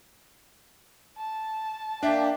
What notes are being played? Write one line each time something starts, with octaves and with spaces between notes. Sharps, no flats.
A5
A#3 D4 D5 E5 G5